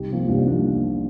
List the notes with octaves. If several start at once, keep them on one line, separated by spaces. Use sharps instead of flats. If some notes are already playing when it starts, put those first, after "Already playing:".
Already playing: C2 D#4 G4
C3 F3 A#3
C2 D4 F4
C4 D#4
C3 F3 A#3 D4